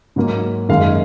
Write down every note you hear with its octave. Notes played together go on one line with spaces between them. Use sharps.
G#2 F#3 A#3
F#2 D#3 G#3 F5